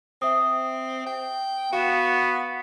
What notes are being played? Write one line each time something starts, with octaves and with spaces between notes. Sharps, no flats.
C4 E5 D#6
G5
B3 F#4 F5 C#7 E7